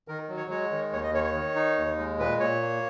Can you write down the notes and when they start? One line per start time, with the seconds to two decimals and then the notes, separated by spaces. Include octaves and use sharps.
0.08 D#3 A#4
0.29 F#3
0.37 C#5
0.50 G#3 C#5
0.71 D#3
0.93 D#2 C#5
1.04 D#5
1.14 D#3 C#5
1.24 C#5
1.35 D#3
1.56 D#4
1.78 D#2
1.98 G#3
2.19 A#2 B4
2.40 A#2 C#5
2.61 A#3